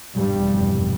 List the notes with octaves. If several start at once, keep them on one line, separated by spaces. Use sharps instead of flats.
F1 E2 G2 B2 G3